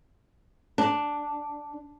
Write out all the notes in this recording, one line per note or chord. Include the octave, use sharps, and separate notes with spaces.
D4